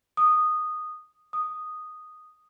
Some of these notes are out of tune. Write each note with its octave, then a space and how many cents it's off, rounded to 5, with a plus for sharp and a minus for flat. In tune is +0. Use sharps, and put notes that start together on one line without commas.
D#6 -10
D#6 -5